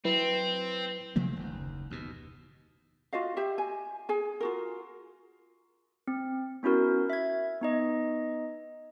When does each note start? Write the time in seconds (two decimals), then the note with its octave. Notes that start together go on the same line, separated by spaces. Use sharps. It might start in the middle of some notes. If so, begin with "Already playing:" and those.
0.05 F#3 C4 E4 B4
1.16 C3 F3 A3 A#3
1.36 F#1 D#2
1.90 D#2 B2
3.13 F4 F#4 D#5 F5
3.37 G4 E5 G5
3.58 G#5
4.09 G#4 G#5
4.41 F4 F#4 A#4
6.07 C4
6.63 B3 C#4 E4 F#4 A#4
7.10 E5 G#6
7.61 B3 D#4 D#5